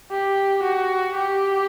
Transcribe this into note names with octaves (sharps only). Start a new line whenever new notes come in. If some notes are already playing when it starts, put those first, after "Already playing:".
G4
F#4
G4